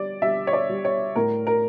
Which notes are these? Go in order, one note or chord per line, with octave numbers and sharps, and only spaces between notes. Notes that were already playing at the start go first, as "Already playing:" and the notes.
Already playing: G3 D5
G3 E5
C#5
D5
G3
C#5
A2 A#4
A#4